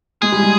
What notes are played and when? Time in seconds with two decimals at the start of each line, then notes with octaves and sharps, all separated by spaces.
0.22 G#3 G#4
0.32 G3
0.42 G#3